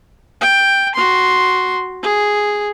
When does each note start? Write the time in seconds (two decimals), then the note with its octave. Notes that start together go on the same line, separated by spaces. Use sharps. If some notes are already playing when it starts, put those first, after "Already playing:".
0.41 G5
0.95 F#4 C6
2.03 G#4